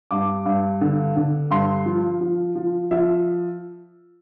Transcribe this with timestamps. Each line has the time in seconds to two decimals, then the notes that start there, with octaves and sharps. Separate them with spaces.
0.11 G2 D6
0.46 G2
0.81 D3
1.16 D3
1.51 G2 C6
1.86 F3
2.21 F3
2.55 F3
2.91 F3 E5